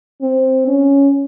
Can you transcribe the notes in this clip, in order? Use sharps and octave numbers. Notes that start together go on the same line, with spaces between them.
C4
C#4